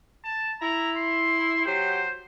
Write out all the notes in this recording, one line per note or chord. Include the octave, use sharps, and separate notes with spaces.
A5
E4 A#5
C6
F#3 G4 C5